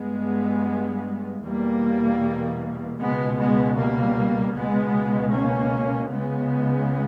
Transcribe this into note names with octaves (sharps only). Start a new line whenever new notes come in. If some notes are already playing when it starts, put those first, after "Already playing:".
Already playing: G2 G#3 B3
E2 B2 G3 A#3
C#2 B2 G#3 B3
G#3 B3
G3 A#3
C#2 B2 G#3 B3
A#3 C#4
C#2 C#3 G#3 B3